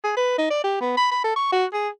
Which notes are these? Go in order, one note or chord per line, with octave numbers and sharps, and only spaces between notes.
G#4
B4
D#4
D5
G4
B3
B5
B5
A4
C#6
F#4
G#4